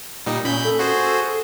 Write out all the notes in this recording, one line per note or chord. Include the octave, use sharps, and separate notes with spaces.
A#2 G3 D#4
A#2 C#4 B5 G6
A4
F#4 G#4 C5